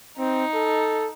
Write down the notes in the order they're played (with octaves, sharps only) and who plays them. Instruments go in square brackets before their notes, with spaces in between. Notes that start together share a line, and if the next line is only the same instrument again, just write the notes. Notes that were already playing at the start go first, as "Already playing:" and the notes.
[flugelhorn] C4 [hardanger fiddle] D#4
[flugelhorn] A4